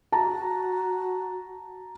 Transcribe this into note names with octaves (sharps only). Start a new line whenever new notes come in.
F#4 A5 A#5